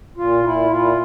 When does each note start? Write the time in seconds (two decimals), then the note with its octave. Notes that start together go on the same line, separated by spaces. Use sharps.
0.17 A#2 F4
0.44 A#2 E4
0.70 A#2 F4